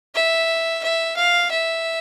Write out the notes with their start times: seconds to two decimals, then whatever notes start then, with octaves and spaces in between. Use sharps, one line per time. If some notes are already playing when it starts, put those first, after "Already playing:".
0.15 E5
0.83 E5
1.17 F5
1.51 E5